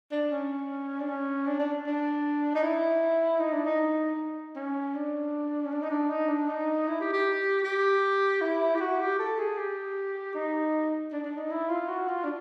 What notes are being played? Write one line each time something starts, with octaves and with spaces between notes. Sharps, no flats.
D4
C#4
D4
C#4
D4
D4
D4
D#4
E4
D#4
D4
D#4
C#4
D4
C#4
D4
D#4
D4
D#4
D4
D#4
E4
G4
G4
G4
E4
G4
F#4
G4
A4
G#4
G4
D#4
D4
D4
D#4
E4
F4
F#4
F4
D4